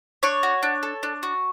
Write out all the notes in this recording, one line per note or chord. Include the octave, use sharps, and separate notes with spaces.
D4 C#5 C#6
F#4
D4
A4
D4
F#4